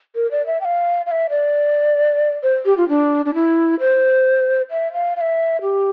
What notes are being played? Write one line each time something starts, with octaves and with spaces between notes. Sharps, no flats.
A#4
D5
E5
G5
F5
F5
E5
D5
C5
G4
F4
D4
D4
E4
C5
E5
F5
F5
E5
G4